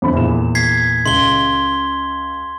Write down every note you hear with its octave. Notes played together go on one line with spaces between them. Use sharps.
F2 D3 B5
E2 A#2 E7
G#6 B6 C7
C#2 C6 G7